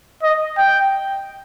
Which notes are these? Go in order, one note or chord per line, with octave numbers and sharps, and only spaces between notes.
D#5
G5